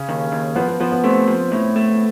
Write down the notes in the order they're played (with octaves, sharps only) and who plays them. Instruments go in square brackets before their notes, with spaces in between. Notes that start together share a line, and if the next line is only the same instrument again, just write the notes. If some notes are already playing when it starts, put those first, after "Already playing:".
Already playing: [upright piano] C#3 C#4
[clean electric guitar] D#2
D#2
[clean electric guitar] F3 [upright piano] B3
[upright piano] B3
[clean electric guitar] F3 [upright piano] B3
[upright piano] B3
[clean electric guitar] A3 [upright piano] C4
[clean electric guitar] F3
A2
A3